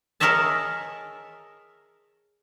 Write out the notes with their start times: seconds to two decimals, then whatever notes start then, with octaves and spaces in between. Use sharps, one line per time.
0.20 G#4 A#4 C#5 D#5 E5 A5